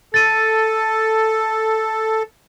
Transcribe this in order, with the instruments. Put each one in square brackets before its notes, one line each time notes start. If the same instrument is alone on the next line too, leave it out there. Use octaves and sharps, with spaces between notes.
[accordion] A4 [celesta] A6 D#7